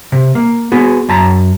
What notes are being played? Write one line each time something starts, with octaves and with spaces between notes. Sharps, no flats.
C3
A#3
B3 F#4 G#4
F#2 A5 A#5